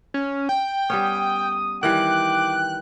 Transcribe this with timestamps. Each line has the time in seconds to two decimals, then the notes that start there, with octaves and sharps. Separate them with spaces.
0.14 C#4
0.49 G5
0.90 G3 B3 C#4 D#6
1.83 D#3 E3 G3 G5 D6 F#6